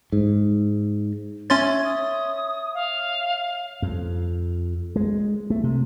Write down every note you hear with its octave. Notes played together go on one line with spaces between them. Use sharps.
G#2
C#4 C#5 E5 C6 G#6 A6
D#6
F5
F2
G#3
A3
C3